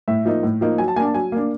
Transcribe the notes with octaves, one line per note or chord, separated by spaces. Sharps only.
A2 E5
F3 A#3 D#4
A2
F3 A#3 D#4
F#3 G#5
A5
A#3 D4 G#5
A5
F#3 G#5
A#3 D4